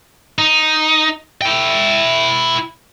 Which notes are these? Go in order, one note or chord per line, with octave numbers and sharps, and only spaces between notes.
D#4
E4 G5